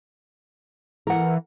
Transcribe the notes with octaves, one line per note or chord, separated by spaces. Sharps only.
E3 A#4 F#5